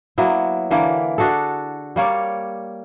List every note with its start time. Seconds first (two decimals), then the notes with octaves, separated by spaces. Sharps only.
0.18 F#3 A#3 B3 E4
0.71 D3 E3 A#3
1.18 D4 F#4 G#4 A4
1.96 G3 A#3 C#5 D5